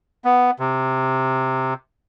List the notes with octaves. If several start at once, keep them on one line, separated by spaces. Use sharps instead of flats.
B3
C3